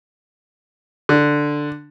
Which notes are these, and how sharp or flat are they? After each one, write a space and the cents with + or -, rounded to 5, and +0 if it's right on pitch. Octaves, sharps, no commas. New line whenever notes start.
D3 +5